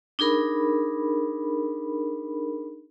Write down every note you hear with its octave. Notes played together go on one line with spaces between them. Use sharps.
D4 D#4 G#4 A#4 B5